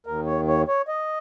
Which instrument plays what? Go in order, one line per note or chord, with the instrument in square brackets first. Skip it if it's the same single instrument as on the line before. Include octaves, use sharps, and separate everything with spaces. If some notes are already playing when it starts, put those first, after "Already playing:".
[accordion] D#2 D#3 A#4
C#5
C#5
C#5
D#5